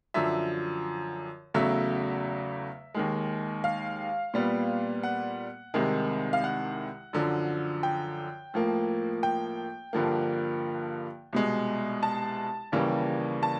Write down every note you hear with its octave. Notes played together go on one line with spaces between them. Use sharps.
F#2 D3 F3 E5
E2 C#3 F#3 A3 E5
D#2 D#3 G#3
F5
A#2 G3 B3
F#5
C2 C3 D#3 G#3
F5
F#5
F#2 D3 F3
G5
A2 F3 A#3
G5
G2 D3 F3 A#3
C2 B2 G#3
A5
D#2 C#3 E3 G3 A#3
A5